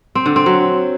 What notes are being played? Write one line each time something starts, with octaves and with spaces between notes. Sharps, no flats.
C4
D3
C4
F#3